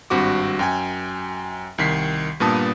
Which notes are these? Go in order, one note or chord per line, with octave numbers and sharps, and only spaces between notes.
G#1 G2 C4 F#4 D6
F#2 G5 G#5
C2 D#3 B6 C7
G2 A#2 B3 A5 D#6